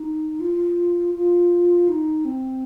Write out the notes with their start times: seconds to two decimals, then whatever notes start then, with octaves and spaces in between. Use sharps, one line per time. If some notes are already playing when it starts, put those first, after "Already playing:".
Already playing: D#4
0.40 F4
1.15 F4
1.89 D#4
2.25 C4